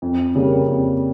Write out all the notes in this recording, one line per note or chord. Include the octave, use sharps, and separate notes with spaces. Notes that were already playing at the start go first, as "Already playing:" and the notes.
F2
C#3 G3 A#3
F2